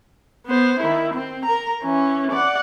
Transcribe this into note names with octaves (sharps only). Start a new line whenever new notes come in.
B3 C5
D#3 E4
C4
A#4 A#5
E3 C#4
D5 F#5